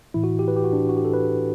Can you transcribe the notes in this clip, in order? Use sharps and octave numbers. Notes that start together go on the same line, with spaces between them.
A2 E3 E4
F#4
G4
B4
G4
F#4
D4
F#4
G4
A4
B4